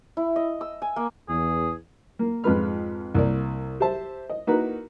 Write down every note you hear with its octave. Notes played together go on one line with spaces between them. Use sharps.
E4
D#5
E6
G#5
A#3
E2 G#4
A#3
F2 G#2 F4 B4 B5 F6
C2 A#3 D5
G4 C5 E5 A5
D#5
A#3 D#4 E4 F#4 A#4 B4